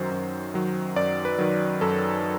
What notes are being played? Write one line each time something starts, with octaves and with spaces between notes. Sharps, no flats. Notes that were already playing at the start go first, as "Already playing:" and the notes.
Already playing: F#2 D#3 F#3 C5
F#2
D#3 F#3
F#2 D5
B4
D#3 F#3
F#2 A4
F#3